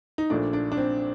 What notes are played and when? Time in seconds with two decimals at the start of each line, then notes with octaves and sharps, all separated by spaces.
0.18 D#4
0.30 A#1 A#2 A3 D4
0.53 D4
0.72 D4
0.77 C4